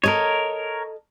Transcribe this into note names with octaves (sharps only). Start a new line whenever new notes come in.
A4 A#4 C#5 D#5